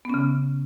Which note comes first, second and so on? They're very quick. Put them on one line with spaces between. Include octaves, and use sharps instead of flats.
B3 C#4 C#3